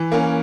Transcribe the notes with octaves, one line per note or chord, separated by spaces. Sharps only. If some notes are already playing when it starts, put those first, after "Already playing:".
Already playing: E3
A#3 C#4